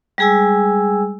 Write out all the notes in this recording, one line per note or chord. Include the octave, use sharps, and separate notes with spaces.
G3 G#3 G#4 G#5 E6